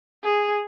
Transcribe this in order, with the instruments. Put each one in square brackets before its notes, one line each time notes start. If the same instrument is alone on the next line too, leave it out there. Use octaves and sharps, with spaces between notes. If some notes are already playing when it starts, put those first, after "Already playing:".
[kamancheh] G#4